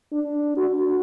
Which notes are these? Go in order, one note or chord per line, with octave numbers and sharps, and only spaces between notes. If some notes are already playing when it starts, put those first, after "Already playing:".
D4
F#4